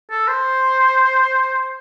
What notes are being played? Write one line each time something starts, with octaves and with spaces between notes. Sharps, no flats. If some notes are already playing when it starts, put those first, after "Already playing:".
A4
C5